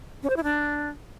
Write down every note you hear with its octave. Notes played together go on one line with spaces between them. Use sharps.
C#4
C5
E4
D4